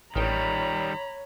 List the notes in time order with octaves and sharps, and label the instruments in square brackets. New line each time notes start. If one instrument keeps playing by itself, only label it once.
[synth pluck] A1 G5 [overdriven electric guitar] D#3 G3 [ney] C#5 [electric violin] A#5 B5